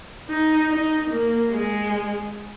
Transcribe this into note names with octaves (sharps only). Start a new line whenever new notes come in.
D#4
D#4
A#3
G#3